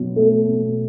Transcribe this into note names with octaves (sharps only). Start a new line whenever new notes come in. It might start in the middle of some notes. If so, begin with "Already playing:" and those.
Already playing: B2 F#3
A3
B2